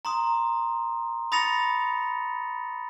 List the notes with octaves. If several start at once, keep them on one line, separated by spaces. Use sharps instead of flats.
A#5 C6 D#6
B5 D#6 A6 A#6 C#7 F7